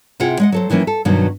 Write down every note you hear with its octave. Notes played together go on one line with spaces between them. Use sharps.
C3 E4 F4 G#4 F#5 G5
G#3 D#5 F#5
F#3 A4 C5
D#3 E3 F#3 A#3 C#4
A4
G2 B2 D#3 F#3